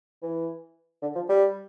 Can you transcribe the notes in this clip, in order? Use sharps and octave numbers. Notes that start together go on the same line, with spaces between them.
E3
D3
F3
G3